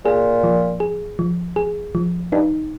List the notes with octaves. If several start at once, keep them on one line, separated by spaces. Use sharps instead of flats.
A#2 G#4
F3
G#4
F3
G#4
F3
G2 D#4